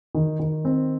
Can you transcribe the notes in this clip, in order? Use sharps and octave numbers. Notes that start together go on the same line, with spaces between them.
D#3
D#3
C4